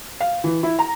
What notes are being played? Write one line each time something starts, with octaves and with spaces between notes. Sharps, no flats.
F5
E3
E4
A#5